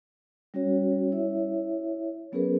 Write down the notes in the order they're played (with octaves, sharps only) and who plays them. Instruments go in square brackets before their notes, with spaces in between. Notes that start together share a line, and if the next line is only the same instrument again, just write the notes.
[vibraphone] G3 C#4 F#4 C#5
E4 C#5 E5
F#3 B3 C#4 G#4 A#4 B4